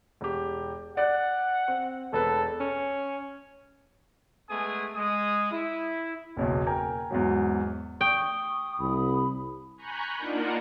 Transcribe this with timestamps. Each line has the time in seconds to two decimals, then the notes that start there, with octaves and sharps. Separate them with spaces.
0.21 E1 G4
0.97 D5 F#5 F#6
1.68 C4
2.13 E1 A4 B4
2.60 C#4
4.50 G#3 A3 B3 G#4 G#5 D#6
4.96 G#3 D#6
5.51 E4
6.36 F#1 B1 E2
6.67 A#4 G5 G#5 A#5
7.10 E2 G#2 F#3
8.01 G5 C#6 D#6
8.80 C2 B5
9.77 G#5 A#5 B5 C#6 F#6 G6
10.17 A#3 D4 D#4 F4 A#4 F#5